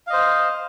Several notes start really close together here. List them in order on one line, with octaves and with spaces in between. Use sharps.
F5 D#5 C5